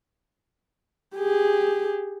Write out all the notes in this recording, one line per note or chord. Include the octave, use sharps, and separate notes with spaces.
G4 G#4